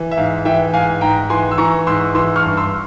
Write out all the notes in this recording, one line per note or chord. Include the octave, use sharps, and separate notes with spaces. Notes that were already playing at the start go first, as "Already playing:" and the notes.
Already playing: E3
E5
G#2 F5
E3 E5 G5
G#2 F5 G#5
G#2 G5 A#5
E3 G#5 C6
E6
E3 A#5 C#6
G#2 C6 E6
E3 C6 E6
C#6 F6
G2
C6 E6